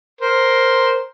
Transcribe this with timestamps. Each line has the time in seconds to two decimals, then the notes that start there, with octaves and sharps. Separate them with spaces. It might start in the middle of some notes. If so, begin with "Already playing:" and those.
0.21 A#4 C5